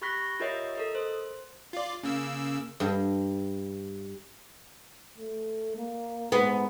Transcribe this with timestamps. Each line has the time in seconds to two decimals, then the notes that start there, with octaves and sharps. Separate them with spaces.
0.02 G4 B5 C#6 F#6 A#6 B6
0.40 F4 G4 A#4 C#5 D#5 E5
0.75 A4 A#4 D#5
0.95 C5
1.73 F4 D5
2.03 C#3 A#3 E6
2.80 G2
5.18 A3
5.77 A#3
6.32 G#2 B3